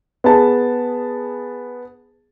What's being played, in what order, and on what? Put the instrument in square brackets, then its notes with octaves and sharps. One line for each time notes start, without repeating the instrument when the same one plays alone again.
[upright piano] B3 G#4 A5